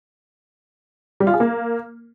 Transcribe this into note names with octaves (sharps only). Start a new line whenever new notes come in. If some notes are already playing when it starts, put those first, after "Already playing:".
G3
F4
G#4
A#3